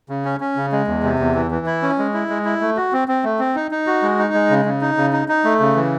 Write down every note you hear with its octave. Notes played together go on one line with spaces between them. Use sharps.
C#3
C#4
C#4
C#3
G#3
E2
C3
E2
E3
E3
E4
C#4
G#3
E4
G#3
E4
A3
F#4
C4
C4
A3
C4
D#4
D#4
F#4
G#3
D#4
G#3
C#3
C#3
D#4
C#3
D#4
D#4
A3
C#3
E3